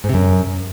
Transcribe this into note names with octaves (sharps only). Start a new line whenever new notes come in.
G#2
C3
F#2